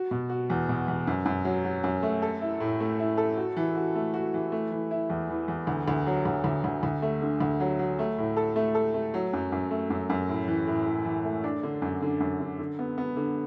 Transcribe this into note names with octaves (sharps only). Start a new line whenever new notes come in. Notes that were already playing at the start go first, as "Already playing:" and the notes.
Already playing: F#4
B2
F#4
E2
B2
E2
F#2
F#2
F#3
F#3
F#2
A3
A4
E4
A2
A3
E4
A4
F#4
E3
F#4
A3
F#4
E3
A3
E3
E4
E2
E3
E2
D2
D2
F#3
D2
D2
D2
D2
A3
D3
D2
F#3
F#3
A3
A2
A4
A3
A4
A3
F#3
F#2
F#2
A3
F#2
F#2
A2
E3
A2
A2
E3
A3
D4
D3
F#2
D3
F#2
D3
D3
B3
B3
D3